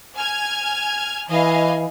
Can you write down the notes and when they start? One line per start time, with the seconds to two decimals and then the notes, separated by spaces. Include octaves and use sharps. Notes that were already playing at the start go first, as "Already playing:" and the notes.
0.16 G#5 F6 G#6
1.29 E3 D#5 F5 G#5